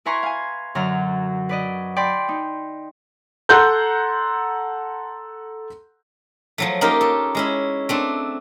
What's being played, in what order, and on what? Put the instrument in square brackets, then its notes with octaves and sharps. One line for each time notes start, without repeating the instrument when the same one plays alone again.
[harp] E4 B4 G#5 A#5 C6 C#6
F5 G#5
F#2 D3 F#3 A#5 F6
B4 D5 D#5
D5 G5 B5 C6
D#4
[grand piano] A4 F#5 A#5 C6 F#6 G6
[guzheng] F3 F#3 A3
A#3 C#4 D#4 F4 G4 A#4
A4
G#3 C#4 E4
A3 C4 D4